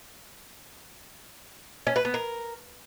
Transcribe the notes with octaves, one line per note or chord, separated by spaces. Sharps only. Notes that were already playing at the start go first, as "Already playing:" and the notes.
C#4
B4
B3
A#4